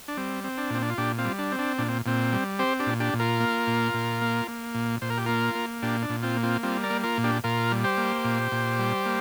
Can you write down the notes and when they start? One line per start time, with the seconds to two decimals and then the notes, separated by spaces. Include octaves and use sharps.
0.08 D4
0.17 G3 C4
0.44 C4
0.58 D4
0.70 A#2 C4
0.82 D4
0.90 F4
0.98 A#2 D4 G4
1.18 C4 F4
1.25 G3
1.39 D4
1.52 C4
1.59 D4
1.78 A#2 D4
1.88 C4
2.06 A#2 C4
2.32 G3
2.59 C4 G4 C5
2.79 D4 G4
2.86 A#2
3.00 D4 G4
3.14 A#2
3.20 F4 A#4
3.40 A#3
3.67 A#2
3.94 A#2
4.22 A#3
4.48 A#3
4.75 A#2
5.02 A#2 C5
5.10 A#4
5.17 G4
5.26 A#3 F4 A#4
5.55 A#3
5.82 A#2 D4 G4
6.02 D4
6.10 A#2
6.23 C4 F4
6.36 A#3
6.43 C4 F4
6.63 G3 C4 F4
6.83 A#4 D5
6.90 A#3
7.03 F4 A#4
7.18 A#2
7.24 D4 G4
7.44 A#2 F4 A#4
7.71 G3
7.84 G4 C5
7.98 A#3
8.25 A#2
8.52 A#2
8.79 G3
9.06 A#3